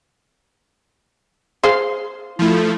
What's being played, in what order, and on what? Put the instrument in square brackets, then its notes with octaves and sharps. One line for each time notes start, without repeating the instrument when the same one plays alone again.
[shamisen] G#4 C5 [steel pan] F5 C6
[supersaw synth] F3 A3 [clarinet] E4